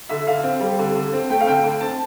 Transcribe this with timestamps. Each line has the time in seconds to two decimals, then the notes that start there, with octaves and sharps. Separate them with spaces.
0.09 D3 E5
0.27 D3 F5
0.43 C4
0.60 G3
0.79 D3
0.95 D3
1.13 C4
1.30 A3 G5
1.41 F5
1.47 D3 G5
1.64 D3
1.81 C4 A5